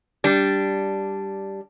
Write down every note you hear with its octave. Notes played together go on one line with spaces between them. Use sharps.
G3 D4